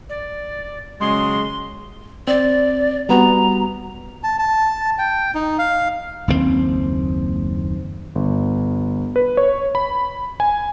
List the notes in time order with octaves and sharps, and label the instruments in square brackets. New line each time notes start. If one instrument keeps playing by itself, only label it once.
[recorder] D5
[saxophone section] C#3 F#3 G#3 [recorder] C6
[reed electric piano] C4 [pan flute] D5
[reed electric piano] G3 B3 F#4 [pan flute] A#5
[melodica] A5
A5
G5
D#4
F5
[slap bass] F#1 D#2 A#2 C4
[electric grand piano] G1
B4
C#5
B5
G#5